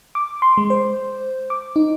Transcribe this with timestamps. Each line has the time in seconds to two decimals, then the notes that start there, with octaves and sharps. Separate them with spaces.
0.15 D6
0.42 C6
0.57 G#3
0.70 C5
1.50 D6
1.76 D#4